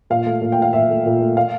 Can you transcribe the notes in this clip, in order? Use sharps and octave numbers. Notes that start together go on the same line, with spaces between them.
A#2 F5
A3
A#2
G5
A3 F5
A#2 E5
A3
A#2
A3
F5